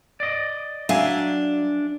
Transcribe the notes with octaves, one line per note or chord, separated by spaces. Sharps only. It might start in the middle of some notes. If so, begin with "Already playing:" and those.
D5 D#5
F#3 D4 E5 F5 G#5